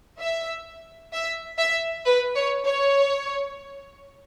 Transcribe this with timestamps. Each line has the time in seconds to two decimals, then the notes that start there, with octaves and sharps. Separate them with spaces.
0.20 E5
1.13 E5
1.59 E5
2.05 B4
2.35 C#5
2.66 C#5